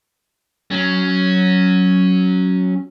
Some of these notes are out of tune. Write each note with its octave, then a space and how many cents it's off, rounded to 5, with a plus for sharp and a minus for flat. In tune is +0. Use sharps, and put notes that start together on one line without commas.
F#3 +0 C#4 +0